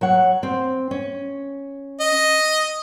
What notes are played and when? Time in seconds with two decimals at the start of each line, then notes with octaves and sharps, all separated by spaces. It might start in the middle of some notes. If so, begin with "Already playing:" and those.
0.01 F#3 C#5 F#5
0.43 C4
0.91 C#4
2.00 D#5